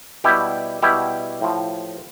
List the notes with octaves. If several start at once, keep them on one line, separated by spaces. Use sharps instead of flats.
B2 G3 E4 G4
B2 G3 E4 G4
A2 F3